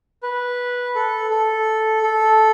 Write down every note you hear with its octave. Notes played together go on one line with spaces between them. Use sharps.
B4
A4
A4
A4